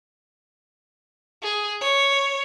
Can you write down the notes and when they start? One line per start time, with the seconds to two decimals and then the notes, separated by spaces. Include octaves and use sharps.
1.42 G#4
1.81 C#5